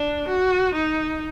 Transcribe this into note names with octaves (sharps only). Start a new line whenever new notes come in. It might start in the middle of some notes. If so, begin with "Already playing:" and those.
Already playing: D4
F#4
D#4